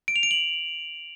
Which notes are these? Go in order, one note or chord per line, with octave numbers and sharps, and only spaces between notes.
D7
F7
D7
F#7